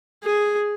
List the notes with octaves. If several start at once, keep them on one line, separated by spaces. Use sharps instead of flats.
G#4